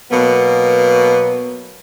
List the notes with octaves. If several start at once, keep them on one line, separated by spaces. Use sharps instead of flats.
B2 F#3 A#3 B3